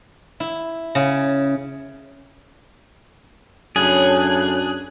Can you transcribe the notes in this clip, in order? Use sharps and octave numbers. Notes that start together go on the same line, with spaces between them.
E4
C#3
F#2 A2 C#3 D4 G#4 F#6